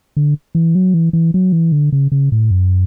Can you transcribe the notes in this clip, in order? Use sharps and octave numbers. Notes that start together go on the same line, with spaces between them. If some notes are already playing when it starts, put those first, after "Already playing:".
D3
E3
F#3
E3
E3
F#3
E3
D3
C#3
C#3
A2
F#2